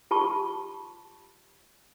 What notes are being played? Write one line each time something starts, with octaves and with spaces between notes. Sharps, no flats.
F4 G4 A5 C#6